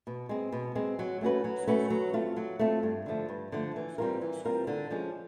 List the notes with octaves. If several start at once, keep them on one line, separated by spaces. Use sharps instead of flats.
B2
G#3 C4
B2
G#3 C4
F#3
A3 C#4 F#4 B4
F#3
A3 C#4 F#4 B4
F#3
A3 C4 F4
F#3
A3 C4 F4
G2
D3 F3 A3
G2
D3 F3 A3
E3
G3 C4 F4 A#4
E3
G3 C4 F4 A#4
D3
F3 G#3 C#4